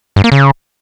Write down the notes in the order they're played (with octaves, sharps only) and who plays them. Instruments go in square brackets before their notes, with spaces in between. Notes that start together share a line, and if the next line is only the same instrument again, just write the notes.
[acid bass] G2
A#3
C#3